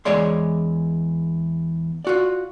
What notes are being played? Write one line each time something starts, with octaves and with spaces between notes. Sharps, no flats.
E2 G#3 G#4 C#5 D5 C6
F4 F#4 D5